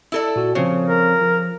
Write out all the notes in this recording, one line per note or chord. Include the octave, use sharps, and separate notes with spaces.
E4 A4 D5
A#2 F#4
C#3 F3 C4 C#5
A#4
F3